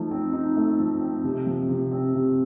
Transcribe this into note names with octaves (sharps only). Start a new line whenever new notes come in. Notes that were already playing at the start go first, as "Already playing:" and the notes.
Already playing: F3 A3 D#4
C4
D#4
A3
F3
C4
C3
F3
C3
C4
C3